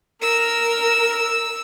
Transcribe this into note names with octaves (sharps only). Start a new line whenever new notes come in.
A#4 E6